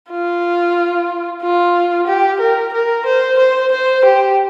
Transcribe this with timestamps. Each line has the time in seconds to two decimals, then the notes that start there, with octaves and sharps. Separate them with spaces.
0.10 F4
1.42 F4
2.07 G4
2.40 A#4
2.73 A#4
3.06 C5
3.39 C5
3.72 C5
4.05 G4